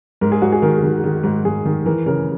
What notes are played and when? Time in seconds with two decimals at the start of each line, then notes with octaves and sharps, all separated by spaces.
0.21 G#2 A#4
0.32 G#4
0.42 G#2 F#4
0.52 G#4
0.62 D#3 A#4
0.83 D#3
1.04 D#3
1.24 G#2
1.45 G#2 G#4
1.65 D#3
1.86 E3 A#4
2.06 C#3 A#4